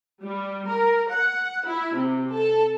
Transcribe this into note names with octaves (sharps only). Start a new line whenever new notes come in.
G3
A#4
F#5
E4
C3
A4